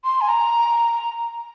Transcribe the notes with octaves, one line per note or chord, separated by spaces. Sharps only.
C6
G#5
A#5